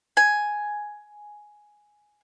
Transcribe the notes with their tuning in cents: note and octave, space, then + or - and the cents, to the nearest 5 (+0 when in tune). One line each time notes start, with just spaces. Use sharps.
G#5 +5